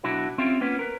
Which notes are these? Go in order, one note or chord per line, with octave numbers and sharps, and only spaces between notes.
B1 D4 E4 F#4 E5 B5
C4 C#4 F4 G4 E5 F5
A#3 B3 C#4 F4 B4
A#4 B4